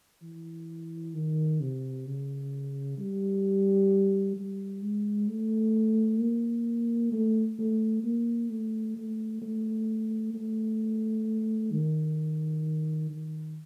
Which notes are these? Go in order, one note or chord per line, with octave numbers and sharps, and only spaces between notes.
E3
D#3
C3
C#3
G3
G3
G#3
A3
A#3
A3
A3
A#3
A3
A3
A3
A3
D#3
D#3